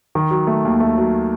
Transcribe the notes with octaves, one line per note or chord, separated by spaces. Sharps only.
D#3
F#3
A3
D#2
A3
F#3